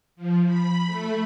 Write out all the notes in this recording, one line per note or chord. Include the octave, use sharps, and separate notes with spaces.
F3
B5
A3